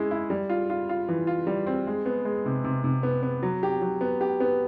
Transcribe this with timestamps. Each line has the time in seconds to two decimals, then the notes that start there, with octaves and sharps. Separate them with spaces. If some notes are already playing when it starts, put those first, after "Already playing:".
Already playing: G#3 C#4 E4
0.11 E4
0.30 G3
0.49 F4
0.70 F4
0.89 F4
1.09 E3
1.27 F4
1.47 G3
1.67 C4
1.87 G#3
2.06 B3
2.25 G#3
2.46 C3
2.64 C3
2.84 C3
3.03 B3
3.23 B3
3.43 F#3
3.63 G4
3.82 F#3
4.01 B3
4.21 G4
4.40 B3